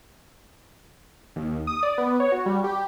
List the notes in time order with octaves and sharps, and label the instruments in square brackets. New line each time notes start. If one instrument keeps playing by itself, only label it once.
[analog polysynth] D#2
D#6
D5
B3
C#5
F#4
G3
G4